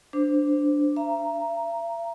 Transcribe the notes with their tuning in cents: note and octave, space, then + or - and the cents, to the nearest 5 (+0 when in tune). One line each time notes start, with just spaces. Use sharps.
D4 +0 C5 -15
E5 +45 A#5 +0